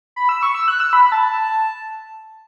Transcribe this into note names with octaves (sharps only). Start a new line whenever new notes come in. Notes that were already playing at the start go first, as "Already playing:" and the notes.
B5
E6
C#6
E6
F#6
E6
B5
A5